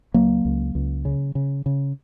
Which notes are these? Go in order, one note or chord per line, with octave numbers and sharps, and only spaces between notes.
C#2 F#3 A#3
C#2
C#2
C#3
C#3
C#3